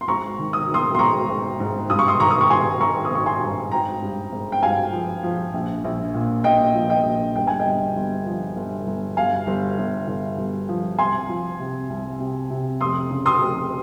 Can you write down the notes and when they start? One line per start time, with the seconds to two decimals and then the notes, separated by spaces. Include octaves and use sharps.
0.01 C6
0.08 G#1 A#5 C#6
0.39 D#3
0.53 D#6
0.68 D#3
0.74 C6 D#6
0.95 C6
0.99 G#1 A#5 C#6
1.29 G#1
1.60 G#2
1.90 G2 D#6
1.99 C#6
2.08 C6 D#6
2.20 D#3 A#5 C#6
2.31 D#6
2.41 C#6
2.50 G2 G#5 C6
2.81 D#3 A#5 C#6
3.05 D#6
3.11 G#1 C#6
3.26 G#5 C6
3.41 G2
3.72 G#1 G5 A#5
4.02 G2
4.32 G#1
4.52 G5
4.63 G2 F5 G#5
4.92 F3
5.23 F3
5.54 A#1
5.84 A#1
6.14 A#2
6.44 A#2 D#5 G5
6.74 F3
6.90 D#5 G5
7.05 A#1
7.35 G1 G5
7.47 G#5
7.60 D#5 G5
7.66 G1
7.96 G1
8.26 F3
8.56 G1
8.87 G1
9.17 G1 F5 G#5
9.47 G1
9.78 G1
10.08 G1
10.38 G1
10.69 F3
10.99 C2 G#5 C6
11.29 F3
11.59 C3
11.90 C2
12.20 C3
12.50 C3
12.81 F1 C6 D#6
13.11 C#3
13.26 C6 D#6
13.41 F1